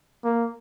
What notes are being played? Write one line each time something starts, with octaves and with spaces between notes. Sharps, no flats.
A#3